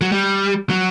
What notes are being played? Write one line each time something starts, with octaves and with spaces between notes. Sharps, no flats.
F#3
G3
F#3